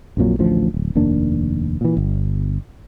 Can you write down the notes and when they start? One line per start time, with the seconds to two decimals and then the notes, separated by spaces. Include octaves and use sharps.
0.17 A#1 F2 A#2 F#3
0.39 A1 D2 F3
0.74 D1
0.95 F1 D#2 A#3 D4
1.81 A#2 E3
1.97 G1